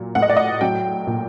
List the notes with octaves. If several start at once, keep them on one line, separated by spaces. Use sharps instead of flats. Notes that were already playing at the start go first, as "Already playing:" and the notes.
Already playing: A#2 F#3
A2 F#5
D#5
D5
D#5
F#3 G5
A#2